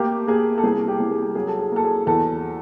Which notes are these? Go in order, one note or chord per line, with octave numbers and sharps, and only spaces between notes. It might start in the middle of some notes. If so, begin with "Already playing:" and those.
Already playing: A3 A#3 G4
A#3 G#4
A4
C2 G#4
G4
C2
G#4
F#3 G#4
A4
G#4
A#3 A4
G#4
E2 A4